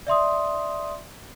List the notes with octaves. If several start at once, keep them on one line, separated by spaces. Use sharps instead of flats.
D5 E5 C6 D#6